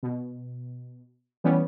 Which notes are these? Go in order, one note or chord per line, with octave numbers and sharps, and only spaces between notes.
B2
E3 G3 B3 C#4